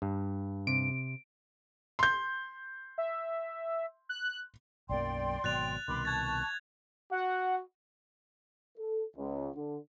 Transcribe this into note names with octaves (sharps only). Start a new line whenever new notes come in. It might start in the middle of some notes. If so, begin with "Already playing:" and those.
G2
C3 D7
C6 G6
E5
F#6
B1 F#2 A#3 D5 G5 C6
G#1 B2 F#3 F#6 A6 F7
C2 B2 D#3 B5 C6 D6
A5 C#6 F#6 G#6 A6
F#4 F#5
A4
C#2
D3